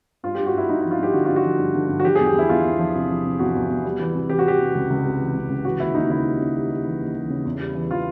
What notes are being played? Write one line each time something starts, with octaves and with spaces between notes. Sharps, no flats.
G2 F4
G2 G4
F#4
G2 E4
G2 D#4
F3 E4
F4
G2 G4
D3 F#4
G2 F4
F#4
F3
G2
D3
G2
F#4
F3 G4
E2 G#4
G4
E2 E4
E2 F4
E2
F3
C3
F3
C3
E2 F#4
E2
E2
G3
E3
C3
E3 G4
F#4
G3 G4
C3
C#2
C#2
C3
E3
C#2
C#2
E3 F#4
D#2 E4
D#2 D#4
C#3 E4
G3
C#3
G3
G3
E3
D#2
E3
C#3
E2
G3
E3
E3 F4